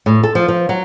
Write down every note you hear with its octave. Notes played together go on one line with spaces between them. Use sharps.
A2
A4
F3
F3
F#3